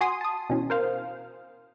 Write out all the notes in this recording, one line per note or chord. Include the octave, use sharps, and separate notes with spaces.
F#4 G#5 C6 D#6
A5 D#6
B2 E3 C#4
A#4 C5 F5